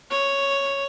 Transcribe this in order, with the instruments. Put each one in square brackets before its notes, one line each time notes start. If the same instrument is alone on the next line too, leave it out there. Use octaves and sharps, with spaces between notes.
[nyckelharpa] C#5